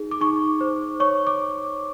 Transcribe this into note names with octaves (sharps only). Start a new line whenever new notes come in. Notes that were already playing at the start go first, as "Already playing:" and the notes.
Already playing: D#4 G#4
D6
D#4 C#6
C5
C#5 C#6
D6